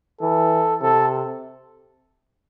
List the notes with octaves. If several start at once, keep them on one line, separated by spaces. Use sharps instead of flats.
E3 A4
C3 A4